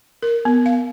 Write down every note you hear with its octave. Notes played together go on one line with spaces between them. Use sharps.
A#4
B3
F5